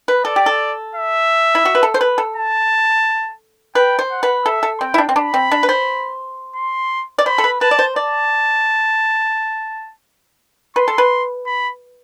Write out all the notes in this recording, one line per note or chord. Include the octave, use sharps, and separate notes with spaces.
B4
A4 D5
G4
A4
E5
E4
F#4
B4
A4
C5
B4
A4
A5
B4 G5
C5
F#5
B4
A4 E5
A4
C4 G5
E4
D4
C4
D4 B5
C4
D4
B4
C5
C6
D5
C5 B5
A4
B4
B4 A5
D5
C5
D5 A5
B4 C6
A4
B4
B5